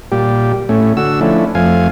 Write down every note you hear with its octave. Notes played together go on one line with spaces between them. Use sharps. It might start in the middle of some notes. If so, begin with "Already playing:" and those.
A#2 G3 G4
A2 A3 C#4
D3 F#4 E6
F3 A3 C#4 D4 E4
F2 F3 A3 F5 G#5